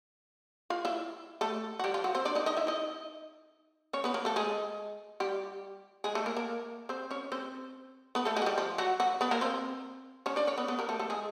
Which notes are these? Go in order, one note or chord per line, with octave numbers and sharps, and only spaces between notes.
F4 F5
E4 E5
A3 A4
F#4
G3 G4
F3 F4
F#3 F#4
C4 C5
D4 D5
D#4 D#5
D#4 D#5
E4 E5
D#4 D#5
C#4 C#5
B3 B4
A#3 A#4
A3 A4
G#3 G#4
G3 G4
G#3 G#4
A3 A4
A#3 A#4
A#3 A#4
C4 C5
C#4 C#5
C4 C5
B3 B4
A3 A4
G#3 G#4
F#4
G3 G4
F3 F4
F#3 F#4
F#3 F#4
B3 B4
A#3 A#4
C4 C5
C#4 C#5
D4 D5
C#4 C#5
B3 B4
B3 B4
A#3 A#4
A3 A4
A3 A4
G#3 G#4